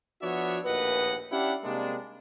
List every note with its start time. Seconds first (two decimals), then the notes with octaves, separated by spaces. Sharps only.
0.22 F3 B3 D4 F#4 C#5 E5
0.65 A#1 D#2 A2 B4 D#5 F#5
1.32 C#4 D4 E4 G4 F5 F#5
1.64 C3 G3 G#3 A#3 D4